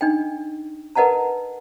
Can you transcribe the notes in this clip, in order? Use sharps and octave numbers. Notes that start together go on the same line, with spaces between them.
D4 D#4 D#5 G5
A#4 B4 D#5 F#5 A5 A#5